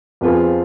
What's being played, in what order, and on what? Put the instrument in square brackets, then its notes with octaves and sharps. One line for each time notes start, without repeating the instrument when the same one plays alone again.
[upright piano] F2 F3 B3 F4 G#4